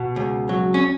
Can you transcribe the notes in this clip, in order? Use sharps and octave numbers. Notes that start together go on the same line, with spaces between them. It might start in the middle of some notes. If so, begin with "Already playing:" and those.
Already playing: B2
C#2
F#3
C#4